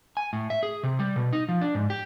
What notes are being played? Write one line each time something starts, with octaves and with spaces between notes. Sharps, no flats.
G#5
A2
E5
G#4
C3
G3
B2
D#4
F3
D4
G#2
G4